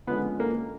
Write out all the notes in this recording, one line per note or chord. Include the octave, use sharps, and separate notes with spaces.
D3 F3 G#3 B3 C#4 B4
A#3 A#4